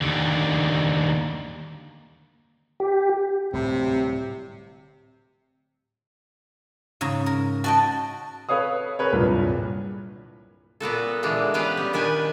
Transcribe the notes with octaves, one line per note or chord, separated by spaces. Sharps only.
D#2 D3
G4
D1 A2 C3 G3
G#2 C#3 A#5
A#4
F#4 D#5 G5 A5
A4 B4 C#5 F5 D#6
G#4 A#4 B4 C#5
D1 C2 G2 A#2
A#2 B3 F#4 A4
A#2 D3 E3 G#3 D4
B3 C#4 G4 B4 F5
G3
A#2 D#3 D4 B4 G#5